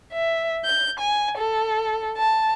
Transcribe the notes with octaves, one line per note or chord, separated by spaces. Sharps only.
E5
G6
G#5
A4
A5